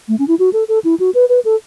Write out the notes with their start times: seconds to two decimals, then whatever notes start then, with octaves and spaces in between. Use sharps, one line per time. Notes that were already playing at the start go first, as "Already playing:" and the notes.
0.08 A3
0.19 C#4
0.28 E4
0.39 F#4
0.53 A4
0.68 A4
0.84 E4
1.00 F#4
1.15 B4
1.29 B4
1.45 A4